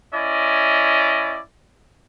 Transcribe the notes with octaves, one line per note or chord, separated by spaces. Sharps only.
C#4 E4 D5 D#5